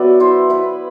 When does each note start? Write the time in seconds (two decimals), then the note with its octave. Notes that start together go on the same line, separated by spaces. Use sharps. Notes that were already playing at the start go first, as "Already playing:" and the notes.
Already playing: F#3 B3 D5 E5
0.20 E4 C5
0.50 E4 B4